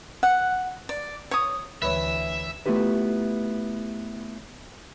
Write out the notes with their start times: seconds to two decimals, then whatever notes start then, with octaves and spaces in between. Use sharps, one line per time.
0.23 F#5
0.89 D5
1.31 C#5 D#6
1.82 D2 E3 B4 C#5 E5
2.66 A3 B3 E4 F4 G4 B4